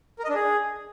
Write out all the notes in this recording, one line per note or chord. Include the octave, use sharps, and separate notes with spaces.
A#4
D#5
D4
G#4